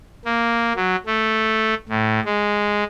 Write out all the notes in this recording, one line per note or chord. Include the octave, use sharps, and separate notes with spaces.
A#3
F#3
A3
A2
G#3